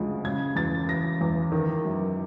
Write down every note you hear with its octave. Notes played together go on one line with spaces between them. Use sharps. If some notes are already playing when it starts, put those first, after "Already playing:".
Already playing: D2 C#3 F3 G#3
C#3 G#6
E2 A6
E3 A#6
E2
D#3
F#2